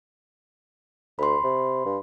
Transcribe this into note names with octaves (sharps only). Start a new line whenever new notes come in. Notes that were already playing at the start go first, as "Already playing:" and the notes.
D2 B5 C6
C3
G2